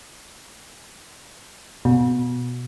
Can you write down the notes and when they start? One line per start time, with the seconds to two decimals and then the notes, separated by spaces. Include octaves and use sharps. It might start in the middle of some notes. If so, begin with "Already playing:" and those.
1.85 B2